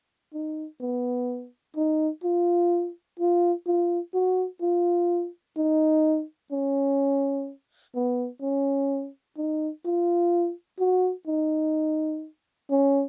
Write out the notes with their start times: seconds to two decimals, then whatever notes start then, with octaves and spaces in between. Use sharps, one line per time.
0.33 D#4
0.81 B3
1.76 D#4
2.24 F4
3.20 F4
3.67 F4
4.14 F#4
4.62 F4
5.57 D#4
6.52 C#4
7.95 B3
8.42 C#4
9.37 D#4
9.85 F4
10.79 F#4
11.27 D#4
12.71 C#4